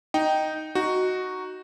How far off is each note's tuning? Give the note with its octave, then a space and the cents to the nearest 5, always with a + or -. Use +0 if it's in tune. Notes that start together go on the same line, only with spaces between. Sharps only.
D#4 +0 G5 -10
D#4 +0 F#4 +0